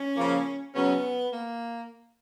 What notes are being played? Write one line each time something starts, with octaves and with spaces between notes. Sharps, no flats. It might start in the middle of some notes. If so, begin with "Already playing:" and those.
Already playing: C#4
C#3 F3 A#3
C#3 F#3 B3 C#4
A#3